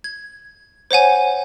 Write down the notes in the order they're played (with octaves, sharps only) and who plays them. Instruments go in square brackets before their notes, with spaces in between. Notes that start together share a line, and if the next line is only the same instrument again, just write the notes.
[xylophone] G#6
C5 C#5 F#5 G#5